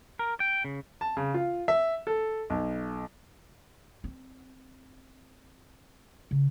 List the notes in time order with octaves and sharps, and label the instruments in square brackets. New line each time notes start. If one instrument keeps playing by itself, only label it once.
[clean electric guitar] A#4
G5
C#3
[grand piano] A5
C#3
F4
E5
A4
B1
[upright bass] C4
C#3